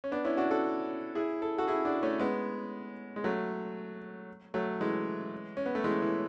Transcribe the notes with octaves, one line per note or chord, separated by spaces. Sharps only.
C#4
B3 D4
C#4 E4
D4 F#4
F#4 A4
E4 G#4
A4
F#4 A4
E4 G#4
D4 F#4
A3 C#4
G#3 B3
G#3
F#3 A3
F#3 A3
E3 G#3
C#4
B3
A3
E3 G#3
E3